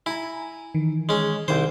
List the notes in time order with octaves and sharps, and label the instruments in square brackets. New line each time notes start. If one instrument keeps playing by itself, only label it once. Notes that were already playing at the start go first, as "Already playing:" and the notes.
[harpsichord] E4 [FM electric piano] G#5 A#5
[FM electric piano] D#3 E3
[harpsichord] G#3 C#4
[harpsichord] C2 C5 [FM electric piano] D#3